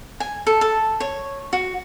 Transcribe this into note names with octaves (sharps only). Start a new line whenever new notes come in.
G#5
A4
A4
C#5
F#4